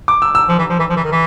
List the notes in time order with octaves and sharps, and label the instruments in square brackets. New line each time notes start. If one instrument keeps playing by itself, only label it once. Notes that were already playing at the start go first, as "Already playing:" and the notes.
[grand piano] D6
E6
E6
[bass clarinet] F3
E3
F3
E3
F3
E3
D#3
E3